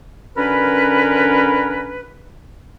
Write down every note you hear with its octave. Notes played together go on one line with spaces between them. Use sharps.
F#2 D3 C#4 A#4 B4